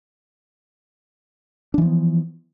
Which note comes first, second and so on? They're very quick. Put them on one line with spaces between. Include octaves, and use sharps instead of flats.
D4 E3 F3 B3